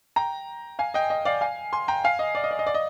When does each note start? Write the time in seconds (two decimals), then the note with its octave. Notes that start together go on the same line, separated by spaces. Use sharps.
0.16 G5 A#5
0.79 F5 G#5
0.94 D#5 G5
1.10 D#5
1.25 D5 F5
1.41 F5 G#5
1.73 G#5 C6
1.88 G5 A#5
2.04 F5 G#5
2.19 D#5
2.35 D5
2.44 D#5
2.51 D5
2.59 D#5
2.67 D5
2.74 D#5